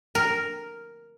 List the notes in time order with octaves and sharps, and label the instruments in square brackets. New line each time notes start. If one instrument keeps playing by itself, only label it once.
[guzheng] A#4